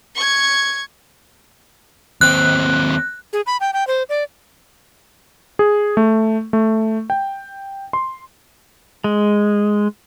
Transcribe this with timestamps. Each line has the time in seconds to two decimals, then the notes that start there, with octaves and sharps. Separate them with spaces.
0.15 C#6 G#6
2.21 D#2 C4 F#6
3.33 G#4
3.46 B5
3.60 G5
3.73 G5
3.87 C5
4.09 D5
5.59 G#4
5.97 A3
6.53 A3
7.10 G5
7.93 C6
9.04 G#3